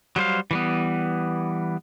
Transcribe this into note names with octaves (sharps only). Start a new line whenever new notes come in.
F#3 G3 C5 F5
E3 G3 B3